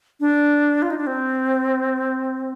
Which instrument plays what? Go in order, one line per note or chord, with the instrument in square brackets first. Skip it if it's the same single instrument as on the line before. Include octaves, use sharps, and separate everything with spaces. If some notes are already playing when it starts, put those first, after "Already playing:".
[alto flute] D4
F4
D#4
D4
C4